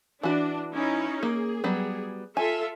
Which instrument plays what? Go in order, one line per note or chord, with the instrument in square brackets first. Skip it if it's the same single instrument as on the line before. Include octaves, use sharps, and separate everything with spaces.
[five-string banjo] E3 F#4 [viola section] D4
[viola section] C#4 D#4 E4
[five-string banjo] A#3 [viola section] G#4
[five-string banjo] F#3 G3 B3
[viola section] F4 A4 E5 [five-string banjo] G#5